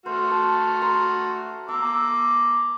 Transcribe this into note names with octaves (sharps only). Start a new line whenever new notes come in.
A3 F#4 C5 F6
A5
A#5 C6
A#5 D6 E6